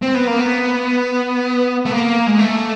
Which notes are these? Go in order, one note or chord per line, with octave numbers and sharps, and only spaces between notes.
C4
B3
A#3
B3
A3
A#3
G#3
A3